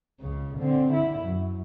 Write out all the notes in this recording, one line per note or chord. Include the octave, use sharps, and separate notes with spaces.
C#2 C#3
D3 C4
D3 E4
F#2